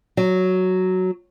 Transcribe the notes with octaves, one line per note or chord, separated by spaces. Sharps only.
F#3